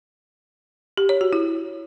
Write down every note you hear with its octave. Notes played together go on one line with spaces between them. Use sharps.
G4
C#5
F#4
E4